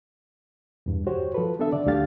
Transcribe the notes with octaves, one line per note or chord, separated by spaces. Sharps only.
E2 G2
F#4 G4 C5 C#5
F3 A4 B4
B3 D4 A4 E5
D3 D5
D2 D3 A3 G4 F5 A6